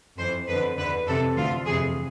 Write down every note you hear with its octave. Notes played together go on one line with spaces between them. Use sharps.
F2 E3 C5
F2 D3 B4
E2 D3 B4
F2 C3 E3 A4
D2 D3 F4
F2 C3 E3 G#4